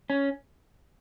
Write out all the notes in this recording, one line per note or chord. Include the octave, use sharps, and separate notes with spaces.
C#4